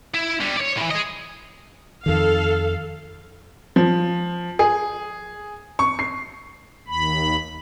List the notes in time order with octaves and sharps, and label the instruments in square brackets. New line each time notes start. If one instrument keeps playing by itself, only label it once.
[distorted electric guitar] E4
D3 G3
C#5 D5
A2 E3
G#4 D#5
[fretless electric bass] F2 D#3 [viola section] A4 F5
[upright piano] F3
G#4
C#6
C7
[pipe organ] D#2 B5